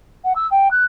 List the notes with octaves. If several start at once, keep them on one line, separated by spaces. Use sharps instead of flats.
F#5
E6
G5
F#6